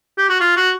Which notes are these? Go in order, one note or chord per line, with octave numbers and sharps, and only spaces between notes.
G4
F#4
F4
F#4